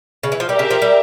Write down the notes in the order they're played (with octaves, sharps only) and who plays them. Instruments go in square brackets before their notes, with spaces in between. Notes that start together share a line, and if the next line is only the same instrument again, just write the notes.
[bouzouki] C#3
E3
F3
[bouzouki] G3 [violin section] G4
[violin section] A#4 E5
[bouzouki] C#3
F3
G3